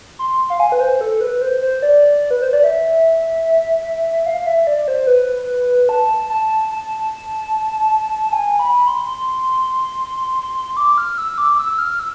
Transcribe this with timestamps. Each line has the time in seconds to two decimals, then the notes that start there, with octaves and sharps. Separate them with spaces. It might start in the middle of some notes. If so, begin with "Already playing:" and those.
0.19 C6
0.50 F5
0.60 G#5
0.72 B4
0.80 C5
1.01 A4
1.21 B4
1.41 C5
1.62 C5
1.82 D5
2.31 B4
2.42 C5
2.53 D5
2.64 E5
4.26 F5
4.46 E5
4.67 D5
4.88 C5
5.07 B4
5.89 A5
6.30 A5
6.70 A5
8.32 G#5
8.59 B5
8.88 C6
10.77 D6
10.98 F6
11.18 E6
11.38 D6
11.58 E6
11.78 F6
11.99 E6